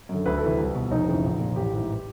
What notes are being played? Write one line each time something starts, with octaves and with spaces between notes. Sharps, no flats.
F#2 D3
D2 B4
A4
C3 E3
C2
B2
F1 D#4
F2 C#3 E3
A#1
A#2
A1 G4
G#2 E3